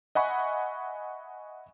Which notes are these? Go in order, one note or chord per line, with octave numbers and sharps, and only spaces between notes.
D#5 E5 F#5 G#5 B5 C#6